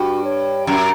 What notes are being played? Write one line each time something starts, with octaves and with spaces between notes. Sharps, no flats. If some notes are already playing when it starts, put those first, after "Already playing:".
Already playing: G2 F#4
C#5
F#2 A#5